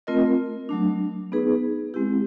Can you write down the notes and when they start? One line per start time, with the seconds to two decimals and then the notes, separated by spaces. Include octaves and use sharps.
0.07 A3 C4 F4 A#4 D#5
0.69 F#3 A3 D4
1.32 B3 D#4 G#4 B4
1.94 G#3 C4 E4 G4